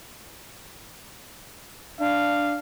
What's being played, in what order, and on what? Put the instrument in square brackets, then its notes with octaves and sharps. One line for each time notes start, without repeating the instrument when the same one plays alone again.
[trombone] D4 [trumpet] F5